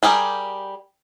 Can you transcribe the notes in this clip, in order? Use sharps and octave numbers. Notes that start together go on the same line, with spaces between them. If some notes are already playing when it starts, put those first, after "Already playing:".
G3 G4 G#4 A#4